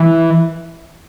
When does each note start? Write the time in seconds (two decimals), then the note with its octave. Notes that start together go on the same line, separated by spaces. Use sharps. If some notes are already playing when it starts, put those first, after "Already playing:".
Already playing: E3